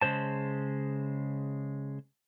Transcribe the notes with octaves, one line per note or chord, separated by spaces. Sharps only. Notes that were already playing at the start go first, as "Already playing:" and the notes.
C#3 G#3 C5 A5